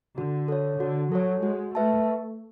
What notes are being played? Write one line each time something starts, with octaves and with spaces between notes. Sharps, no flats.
D3 F#4
A4 C#5
D3 F#4
F#3 A4 C#5
G#3 F#4
A3 B4 E5 A5